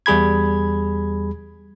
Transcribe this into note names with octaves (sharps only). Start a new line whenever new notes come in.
E2 G3 G#4 B5 G#6